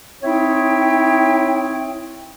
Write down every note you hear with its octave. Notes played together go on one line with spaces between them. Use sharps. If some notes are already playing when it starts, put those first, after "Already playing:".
C4 D#4 E4 C#5 E5 G5